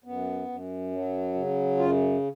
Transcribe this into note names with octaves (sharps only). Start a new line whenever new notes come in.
F#2 B3
F#2
F#3
C#3
F#2 F4